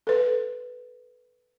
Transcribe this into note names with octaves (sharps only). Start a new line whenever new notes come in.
A4 B4